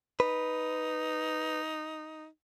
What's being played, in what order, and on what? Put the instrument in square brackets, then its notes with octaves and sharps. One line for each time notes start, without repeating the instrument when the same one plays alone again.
[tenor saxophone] D#4 [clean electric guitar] B4